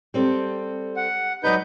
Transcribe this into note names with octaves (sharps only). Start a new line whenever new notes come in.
G3 C4 A4
F#5
F#3 D#4 B4 D5 D#5 G6